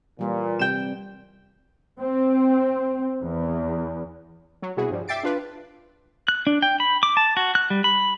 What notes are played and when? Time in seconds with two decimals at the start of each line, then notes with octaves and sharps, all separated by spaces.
0.19 A#2 E3 G3 B4
0.59 C3 G3 C4 G5 E7
2.01 C4
3.22 E2
4.62 F#3
4.77 C2 B2 E4 F#4 G#4
4.90 G2 F3 G3
5.08 E5 G5 D6 A6 C7 D7
5.23 D4 F4 B4
6.28 F#6
6.47 D4
6.62 G5
6.80 B5
7.03 D6
7.17 A5
7.37 F#4
7.55 F#6
7.70 G3
7.84 B5